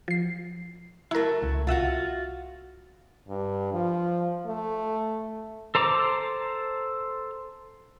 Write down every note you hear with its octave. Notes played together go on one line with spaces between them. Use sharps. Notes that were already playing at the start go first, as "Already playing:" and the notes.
F3 C7
F#3 A3 E4 A#4
C#2
C2 F4 F#4 E5 F#5
G2
F3
A3
A4 C5 A#5 D6